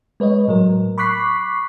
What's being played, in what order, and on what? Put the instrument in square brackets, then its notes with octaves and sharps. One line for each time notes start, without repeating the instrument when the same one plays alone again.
[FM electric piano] G#3 B4 C#5 D#5
A2 F#3 A#4
B5 C#6 D6 F#6 B6 C7